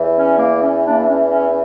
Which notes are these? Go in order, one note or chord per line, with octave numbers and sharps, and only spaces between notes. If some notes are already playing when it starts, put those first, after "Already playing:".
Already playing: E2 E3
C#4
A#3
C#4
A#3 D4
D4
C#4
C#4